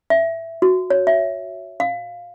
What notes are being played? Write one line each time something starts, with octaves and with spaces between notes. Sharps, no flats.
E5
F#4
C#5
E5
F5